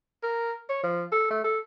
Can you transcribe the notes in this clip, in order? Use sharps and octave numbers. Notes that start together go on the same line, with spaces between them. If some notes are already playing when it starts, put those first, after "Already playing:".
A#4
C#5
F3
A4
A3
A4